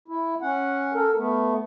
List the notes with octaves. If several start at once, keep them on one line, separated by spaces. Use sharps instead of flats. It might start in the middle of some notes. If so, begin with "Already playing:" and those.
E4
C#4 F#5
A4 A#4
A3 B3